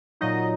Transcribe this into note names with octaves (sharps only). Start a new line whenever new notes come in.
A#2 F#3 D#4 D#5